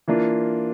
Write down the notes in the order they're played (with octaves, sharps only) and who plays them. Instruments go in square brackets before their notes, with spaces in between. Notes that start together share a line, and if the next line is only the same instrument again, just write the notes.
[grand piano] E3 A#3 D4 F4